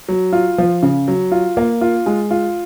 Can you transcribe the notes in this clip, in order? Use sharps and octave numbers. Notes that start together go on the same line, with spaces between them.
F#3
F4
F3
C#3
F#3
F4
A#3
F4
G#3
F4